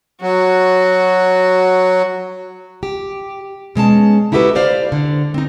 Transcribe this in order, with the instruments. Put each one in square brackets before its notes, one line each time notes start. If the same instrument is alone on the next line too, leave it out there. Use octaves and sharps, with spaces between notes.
[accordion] F#3 [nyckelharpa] F#4
[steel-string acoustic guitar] G4
B2 G#3 C#4 A5
D#4 E4 F#4 G4 A4 B4
G4 C5 D5 F5
D3
C4 D#4